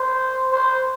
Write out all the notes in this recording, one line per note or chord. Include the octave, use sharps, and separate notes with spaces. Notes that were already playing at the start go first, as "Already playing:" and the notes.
Already playing: C5
C5